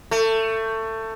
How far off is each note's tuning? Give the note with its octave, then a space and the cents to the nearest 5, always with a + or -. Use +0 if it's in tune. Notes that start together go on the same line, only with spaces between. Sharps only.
A3 +20